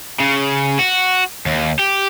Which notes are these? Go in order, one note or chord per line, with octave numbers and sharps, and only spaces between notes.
C#3
F#4
D#2
G4